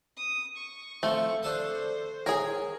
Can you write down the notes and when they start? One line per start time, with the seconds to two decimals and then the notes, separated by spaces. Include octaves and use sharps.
0.17 D#6
0.56 C#6
1.03 F3 A3 C4
1.43 D4 A4 C5 D#6
2.26 G#4 A#4 C#5 G#5